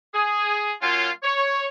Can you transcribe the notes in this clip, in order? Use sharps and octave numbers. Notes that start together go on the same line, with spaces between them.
G#4
F#3 A#3 C#4 F4
C#5